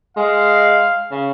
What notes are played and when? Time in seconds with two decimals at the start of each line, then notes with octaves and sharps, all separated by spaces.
0.17 G#3 F5
1.11 C#3